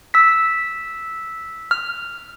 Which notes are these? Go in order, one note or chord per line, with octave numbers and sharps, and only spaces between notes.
E6 B6
F6